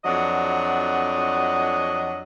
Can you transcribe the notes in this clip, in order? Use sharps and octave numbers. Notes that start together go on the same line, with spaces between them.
F2 F#3 D4 F#4 D#5